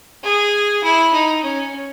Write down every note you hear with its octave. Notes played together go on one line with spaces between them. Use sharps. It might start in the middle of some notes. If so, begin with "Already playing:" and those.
G#4
E4
D#4
C#4